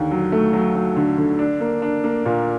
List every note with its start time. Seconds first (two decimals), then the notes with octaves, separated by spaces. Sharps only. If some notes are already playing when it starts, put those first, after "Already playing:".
Already playing: D#2 D3
0.11 F#3
0.32 A3
0.53 F#3
0.75 F#3
0.96 D3
1.18 D3
1.39 D4
1.60 A#3
1.82 D4
2.04 A#3
2.26 A#2